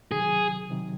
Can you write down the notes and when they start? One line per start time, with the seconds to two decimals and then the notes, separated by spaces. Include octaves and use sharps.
0.11 C3 D#3 F#3 G#4
0.70 C3 D#3 F#3